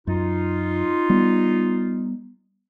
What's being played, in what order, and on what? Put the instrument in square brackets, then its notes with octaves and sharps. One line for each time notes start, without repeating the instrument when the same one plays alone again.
[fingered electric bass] F#2 [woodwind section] D#4 F4
[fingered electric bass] G3 B3